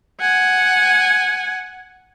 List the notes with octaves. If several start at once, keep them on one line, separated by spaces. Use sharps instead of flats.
F#5 G#5